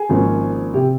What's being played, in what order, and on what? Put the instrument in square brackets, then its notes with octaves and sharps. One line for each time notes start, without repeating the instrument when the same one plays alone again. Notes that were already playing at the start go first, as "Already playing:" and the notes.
Already playing: [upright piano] G#4
G#1 G#2 F3 A#3 C#4
C3 G4